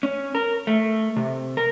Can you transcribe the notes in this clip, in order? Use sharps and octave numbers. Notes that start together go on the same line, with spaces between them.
C#4
A#4
A3
C3
A#4